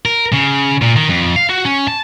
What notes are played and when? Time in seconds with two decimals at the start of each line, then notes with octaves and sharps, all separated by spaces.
0.05 A#4
0.32 C#3
0.82 A#2
0.96 D#3
1.09 F2
1.36 F5
1.49 F#4
1.65 C#4
1.88 A5